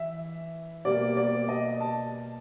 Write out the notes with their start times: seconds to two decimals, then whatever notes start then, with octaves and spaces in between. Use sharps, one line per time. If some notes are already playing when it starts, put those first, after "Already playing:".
Already playing: E3 E5
0.85 B2 G3 A#3 D5
1.17 D5
1.49 D#5
1.80 A5